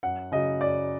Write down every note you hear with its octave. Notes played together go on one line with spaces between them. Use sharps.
F#2 F#5
C#3 F#3 D#5
F#2 D5